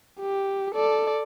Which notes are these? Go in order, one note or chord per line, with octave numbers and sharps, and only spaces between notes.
G4
A4 D5